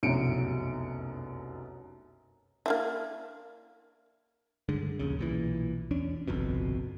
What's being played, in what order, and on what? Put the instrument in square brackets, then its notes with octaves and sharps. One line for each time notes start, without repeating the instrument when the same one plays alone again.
[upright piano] F1 C2 F#2 B2 C#7 D7
[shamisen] A#3 D4 E4
[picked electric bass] G2 D3 G#3
A#1 D#2 C#3
B1 A#2 E3
E2 C#4 D4
G1 C2 F2 B2